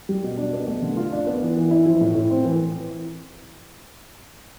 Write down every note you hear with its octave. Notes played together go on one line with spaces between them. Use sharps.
G3
B2
D4
B3
A3
D3
F4
D4
B3
E3
E3
E4
F3
A2
A2
C4
E3